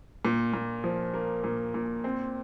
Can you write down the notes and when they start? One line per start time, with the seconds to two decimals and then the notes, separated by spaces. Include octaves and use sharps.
0.25 A#2
0.54 A#2
0.84 F3
1.14 A#3
1.44 A#2
1.74 A#2
2.04 C4